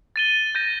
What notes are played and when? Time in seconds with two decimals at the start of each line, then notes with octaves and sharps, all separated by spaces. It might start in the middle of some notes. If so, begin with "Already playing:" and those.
0.16 A6 D#7 G7
0.55 G6 A#6 D#7